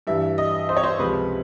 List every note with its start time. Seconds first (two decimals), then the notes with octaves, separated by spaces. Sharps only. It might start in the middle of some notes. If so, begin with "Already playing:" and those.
0.07 G2 E3 G3 E5
0.38 D#5
0.69 C5
0.77 C#5
0.84 C5
0.99 C#2 C3 F3 B4